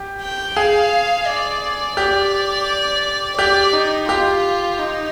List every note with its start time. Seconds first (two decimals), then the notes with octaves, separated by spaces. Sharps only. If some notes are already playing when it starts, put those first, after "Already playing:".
Already playing: G4
0.22 G5
0.56 G#4 F5
1.27 D5
1.97 G4 D5
3.37 G4 D5
3.73 D#4
4.08 F4 G4
4.79 D#4